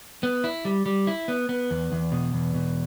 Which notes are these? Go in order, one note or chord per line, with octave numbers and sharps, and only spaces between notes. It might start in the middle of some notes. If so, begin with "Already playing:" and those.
B3
E4
G3
G3
E4
B3
B3
E2
E2
B2
E2
B2